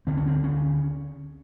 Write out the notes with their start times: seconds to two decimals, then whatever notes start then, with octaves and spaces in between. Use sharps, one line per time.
0.07 D2 D3 C4
0.17 C#4
0.28 C4
0.44 C#4